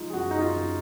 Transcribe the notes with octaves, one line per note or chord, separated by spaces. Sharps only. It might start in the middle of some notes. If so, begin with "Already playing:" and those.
Already playing: F3 G#3 D#4 F4
G#4
F#2 F#4
D#4
F4
F#2